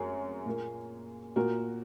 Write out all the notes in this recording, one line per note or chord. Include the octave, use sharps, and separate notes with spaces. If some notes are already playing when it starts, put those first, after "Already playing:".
Already playing: F#2 F#3 G#4 C#5
A#2 A#3
A#2 F#4 A#4